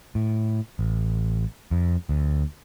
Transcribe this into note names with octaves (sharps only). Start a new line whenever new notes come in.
A2
A1
F2
D2